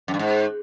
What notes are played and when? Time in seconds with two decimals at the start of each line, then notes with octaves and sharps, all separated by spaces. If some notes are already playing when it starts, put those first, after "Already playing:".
0.08 F#2
0.14 G2
0.19 G#2